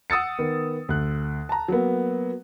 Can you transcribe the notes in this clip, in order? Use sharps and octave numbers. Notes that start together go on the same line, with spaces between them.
F#5 D#6 E6 A6 C#7
D#3 B3
D2 F#6
A5 A#5
F#3 A#3 B3